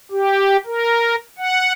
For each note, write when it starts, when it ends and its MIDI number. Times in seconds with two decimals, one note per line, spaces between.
0.11 0.57 67
0.67 1.16 70
1.38 1.73 78